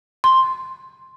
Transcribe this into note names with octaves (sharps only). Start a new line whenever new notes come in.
C6